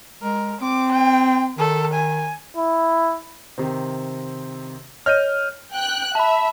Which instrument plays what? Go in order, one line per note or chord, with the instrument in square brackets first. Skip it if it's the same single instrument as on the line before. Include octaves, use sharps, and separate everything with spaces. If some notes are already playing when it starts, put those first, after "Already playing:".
[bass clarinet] G#3 [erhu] A#4
[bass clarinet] C4 [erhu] D6
[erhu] G5
[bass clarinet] D#3 [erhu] A4
[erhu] G#5
[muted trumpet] E4
[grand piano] C3 D#3 C4
[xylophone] C#5 D#5 [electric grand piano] F6 G6 D#7
[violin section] G5 F#6
[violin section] E5 [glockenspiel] A5 B5